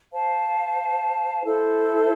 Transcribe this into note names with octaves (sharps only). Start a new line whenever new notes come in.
C5 F5 A5
E4 A4 C5